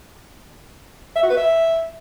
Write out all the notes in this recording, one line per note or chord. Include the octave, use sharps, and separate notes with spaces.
E5
F#4
B4
E5